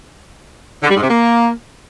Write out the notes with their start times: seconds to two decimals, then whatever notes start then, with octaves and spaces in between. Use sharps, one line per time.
0.84 D3
0.90 G3
0.97 G#2
1.03 C3
1.10 A#3